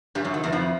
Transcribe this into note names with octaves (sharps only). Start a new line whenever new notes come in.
G2 G3
F#2 F#3
D#3
E2 E3
F2 F3